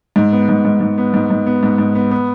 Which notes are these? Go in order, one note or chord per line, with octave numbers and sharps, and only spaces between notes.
G#2
B3
G#2
G#2
G#2
B3
G#2
G#2
B3
G#2
G#2
B3
B3